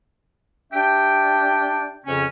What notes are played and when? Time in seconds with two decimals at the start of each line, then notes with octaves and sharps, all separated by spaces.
0.73 D4 G4 E5 G5
2.06 F2 C#3 C#4